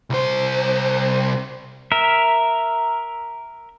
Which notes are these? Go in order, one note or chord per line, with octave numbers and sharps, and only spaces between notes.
C2 C5
A#4 E5